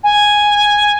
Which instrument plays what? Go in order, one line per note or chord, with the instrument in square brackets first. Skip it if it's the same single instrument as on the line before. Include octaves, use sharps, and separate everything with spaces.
[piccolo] G#5